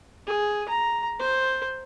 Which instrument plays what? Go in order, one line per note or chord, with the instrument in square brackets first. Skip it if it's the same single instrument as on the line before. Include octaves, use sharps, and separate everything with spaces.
[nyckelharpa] G#4
A#5
C5